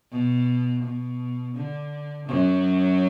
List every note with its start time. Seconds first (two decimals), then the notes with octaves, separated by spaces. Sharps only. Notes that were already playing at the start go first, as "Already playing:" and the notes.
0.11 B2
0.83 B2
1.55 D3
2.28 F#2 F#3